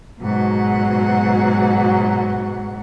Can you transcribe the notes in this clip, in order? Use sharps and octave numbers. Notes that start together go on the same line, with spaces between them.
G#2 B2 F#3 F#5